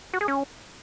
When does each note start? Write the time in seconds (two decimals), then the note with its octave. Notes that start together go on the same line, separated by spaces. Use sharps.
0.14 F#4
0.21 G#4
0.28 C#4